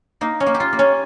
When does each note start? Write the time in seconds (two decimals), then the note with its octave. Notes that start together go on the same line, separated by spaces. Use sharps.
0.21 A#3 D#4
0.40 C#4
0.46 A#3
0.54 G4
0.60 F4
0.73 A#3
0.79 C#4